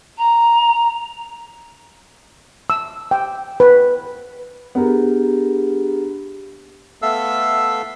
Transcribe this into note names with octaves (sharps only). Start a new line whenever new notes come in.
A#5
E6
G5
B4
B3 D4 G4 G#4 A#4
A3 B3 A4 E5 F5 E6